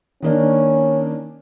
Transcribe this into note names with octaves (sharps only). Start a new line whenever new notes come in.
D#3 A#3 C#4 D4